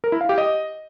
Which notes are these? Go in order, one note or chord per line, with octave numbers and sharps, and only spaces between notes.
A#4
E4
F5
G4
D#5